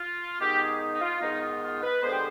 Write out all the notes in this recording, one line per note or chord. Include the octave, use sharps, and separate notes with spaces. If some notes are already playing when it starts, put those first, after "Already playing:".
Already playing: F4
G#2 D#3 B3 G4
G#4
D#4
F4
G#2 D#3 B3 D#4
F4
F4
B4
D3 G#3 B3 C5
G4